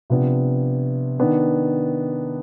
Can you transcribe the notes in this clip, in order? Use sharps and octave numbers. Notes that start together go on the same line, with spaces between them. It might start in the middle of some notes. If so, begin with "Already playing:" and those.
C3 F3 B3 D4
D#3 B3 D4